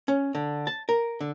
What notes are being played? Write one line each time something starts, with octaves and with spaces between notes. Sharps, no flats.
C#4
D3
A5
A#4
D3